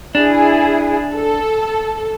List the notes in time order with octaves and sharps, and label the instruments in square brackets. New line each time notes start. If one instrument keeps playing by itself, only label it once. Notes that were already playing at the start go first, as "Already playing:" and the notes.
[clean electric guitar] D4 [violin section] E4 G#4
[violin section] A4